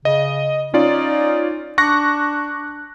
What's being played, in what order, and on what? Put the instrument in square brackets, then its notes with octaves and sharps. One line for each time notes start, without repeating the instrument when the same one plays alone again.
[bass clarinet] C#3 [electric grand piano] D#5
[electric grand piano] C#4 F4 D5 [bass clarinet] D#4
[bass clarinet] D4 [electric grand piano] C#6 F#6 A#6